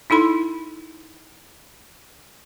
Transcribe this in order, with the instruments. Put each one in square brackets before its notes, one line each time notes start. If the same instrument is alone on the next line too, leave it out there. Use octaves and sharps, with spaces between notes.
[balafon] D#4 E4 A4 B5 C6